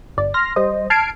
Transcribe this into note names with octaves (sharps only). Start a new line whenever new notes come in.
G1 D5
C6 F6 A#6
G3 C5 D#5
A5 F6 G#6 C7 D7